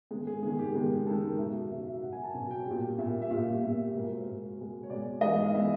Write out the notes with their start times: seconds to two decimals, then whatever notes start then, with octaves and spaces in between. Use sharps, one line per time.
0.11 G#2 D#3 G#3 G#4
0.27 G#4
0.43 G#2 D#3 G#3 G#4
0.59 G4
0.74 G#2 D#3 G#3 G#4
1.07 G#2 D#3 G#3 A4
1.23 A#4
1.38 B2 F#3 E5
1.71 B2 F#3 E5
1.87 E5
2.02 B2 F#3 F#5
2.13 G#5
2.24 A5
2.34 B2 F#3 G#5
2.51 G5
2.66 A#2 G3
2.98 A#2 G3 E5
3.22 E5
3.30 A#2 G3 F5
3.62 A#2 G3 E5
3.94 B2 G#3 A#4
4.10 C5
4.26 B2 G#3
4.58 B2 G#3
4.83 C#5
4.90 B2 G#3 D5
5.21 G#2 E3 G#3 D#5
5.44 F5
5.54 E3 G#3 E5